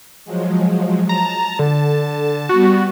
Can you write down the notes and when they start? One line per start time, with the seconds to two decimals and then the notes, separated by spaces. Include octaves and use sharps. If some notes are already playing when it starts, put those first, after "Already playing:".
0.25 F3 F#3 G#3
1.09 A5 A#5
1.59 D3 A5
2.49 G3 B3 F#4